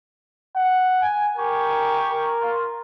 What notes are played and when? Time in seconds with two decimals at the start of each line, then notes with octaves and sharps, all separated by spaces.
0.56 F#5
1.02 G#5
1.37 G4 A#4 G#5 C#6
2.10 A#4
2.40 F4